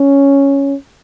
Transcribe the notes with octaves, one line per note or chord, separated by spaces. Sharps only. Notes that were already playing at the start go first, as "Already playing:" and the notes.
Already playing: C#4